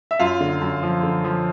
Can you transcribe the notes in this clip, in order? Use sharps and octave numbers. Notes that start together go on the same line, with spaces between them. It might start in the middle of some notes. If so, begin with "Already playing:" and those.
E5
F#2 F4 F5
D3
F#2
F3
D3
F3